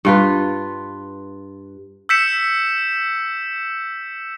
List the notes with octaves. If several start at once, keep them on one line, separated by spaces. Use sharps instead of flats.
G2 F4 B4
E6 G6 B6 C#7 E7